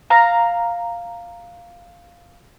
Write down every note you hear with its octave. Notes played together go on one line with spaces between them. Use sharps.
F5 A#5